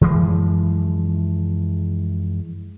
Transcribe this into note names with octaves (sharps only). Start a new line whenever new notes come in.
F#2 E3 F3 G#3